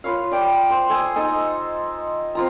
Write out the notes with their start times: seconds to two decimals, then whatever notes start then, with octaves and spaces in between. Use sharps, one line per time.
0.04 F4 B4 C#5 F5
0.31 D5 G5
0.70 C5
0.90 A4 G#5 D#6
1.15 D#4 A4 D#5 G#5
2.35 C4 F4 A#5